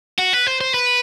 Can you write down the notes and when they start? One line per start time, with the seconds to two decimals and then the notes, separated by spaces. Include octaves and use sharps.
0.19 F#4
0.33 B4
0.47 C5
0.61 C5
0.74 B4